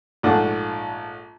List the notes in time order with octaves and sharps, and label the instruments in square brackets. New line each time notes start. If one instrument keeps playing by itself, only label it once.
[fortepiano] A#1 G#2 A3 D4 F#5